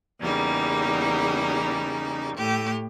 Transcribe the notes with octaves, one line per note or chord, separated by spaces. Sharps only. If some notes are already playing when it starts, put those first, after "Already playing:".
E2 C#3 G3 A#3 D#4
A2 G4